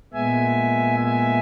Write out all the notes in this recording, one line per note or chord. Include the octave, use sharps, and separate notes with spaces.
A#2 G#3 B3 E5 G#5
E5 G#5